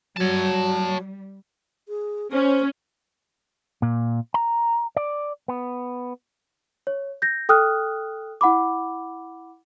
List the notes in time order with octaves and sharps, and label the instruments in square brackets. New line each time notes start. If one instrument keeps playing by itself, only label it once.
[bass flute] F#3 [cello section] G3 [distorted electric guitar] C#5 A5
[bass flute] G#4
[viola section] C#4 [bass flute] C5
[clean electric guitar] A#2
A#5
D5
B3
[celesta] C#5
G6 A#6
A4 G5 D#6 F6 F#6
E4 F#5 B5 D6